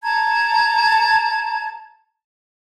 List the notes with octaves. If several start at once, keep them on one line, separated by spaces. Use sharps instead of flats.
A5 A#5 G#6